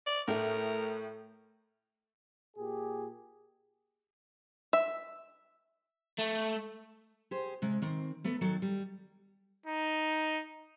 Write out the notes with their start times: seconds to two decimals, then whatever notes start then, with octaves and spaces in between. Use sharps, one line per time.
0.06 D5
0.28 A2 A3 A#4
2.56 A#2 G4 G#4
4.73 E5
6.19 A3
7.31 G4 G#4 C5
7.62 C3 G#3
7.82 D#3 C4
8.24 A3 B3 A4
8.41 D#3 F#3 F#4 A4
8.62 G3
9.66 D#4